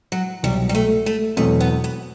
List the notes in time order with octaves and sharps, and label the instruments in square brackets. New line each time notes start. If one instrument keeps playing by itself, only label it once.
[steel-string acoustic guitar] F#3
[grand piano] C2 B2 F#3 [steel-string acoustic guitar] G3
[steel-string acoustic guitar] G3
A3
A3
[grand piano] E2 B2 F#3 C4 [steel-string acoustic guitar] A3
[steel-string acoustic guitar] B3
B3